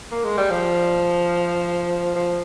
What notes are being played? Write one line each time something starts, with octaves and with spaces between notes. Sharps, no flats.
A#3
G#3
G3
F3
F3